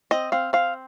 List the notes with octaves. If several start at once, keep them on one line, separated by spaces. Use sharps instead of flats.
C4 D#5
C4 F5
C4 F5